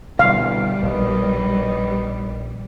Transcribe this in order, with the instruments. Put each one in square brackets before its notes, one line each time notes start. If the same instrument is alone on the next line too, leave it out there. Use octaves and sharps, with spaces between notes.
[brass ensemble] G1 C2 E3 [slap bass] B2 D3 [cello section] G3 [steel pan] F5
[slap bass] A#1 B2 D#3 [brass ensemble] A#4 B4 D#5